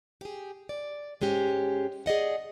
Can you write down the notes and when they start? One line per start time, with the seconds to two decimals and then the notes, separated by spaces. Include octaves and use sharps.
0.21 G4 G#4
0.69 D5
1.21 G#2 G#3 C#4 G4
2.06 G#4 D5 D#5 F#5